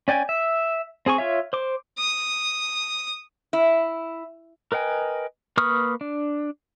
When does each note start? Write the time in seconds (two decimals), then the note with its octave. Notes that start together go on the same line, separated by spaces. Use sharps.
0.08 C#4 D5 G5 G#5
0.29 E5
1.06 C4 G#4 G#5 C#6
1.18 F4 C#5 E5
1.53 C5 D6
1.98 D#6
3.53 E4
4.72 A#4 B4 D#5 G5 G#5
5.57 A#3 B4 C#6 D#6 F6
6.01 D4